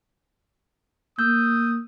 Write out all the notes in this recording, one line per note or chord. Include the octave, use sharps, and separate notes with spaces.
A#3 D#6 E6 G6